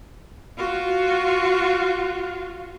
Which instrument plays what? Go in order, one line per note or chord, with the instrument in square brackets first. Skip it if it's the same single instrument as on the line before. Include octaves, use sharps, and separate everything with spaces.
[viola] F4 F#4